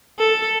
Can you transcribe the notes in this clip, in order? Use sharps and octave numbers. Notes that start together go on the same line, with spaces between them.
A4